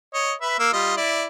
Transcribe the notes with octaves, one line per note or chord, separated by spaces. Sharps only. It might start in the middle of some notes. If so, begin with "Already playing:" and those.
C#5 D#5
B4 E5
A#3 E6
G3 F4 D#5
E4 D5